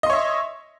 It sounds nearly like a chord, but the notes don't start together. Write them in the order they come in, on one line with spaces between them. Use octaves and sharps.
D#5 C6 C#5 E5